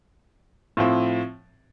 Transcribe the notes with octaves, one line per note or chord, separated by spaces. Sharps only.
A2 F3 C4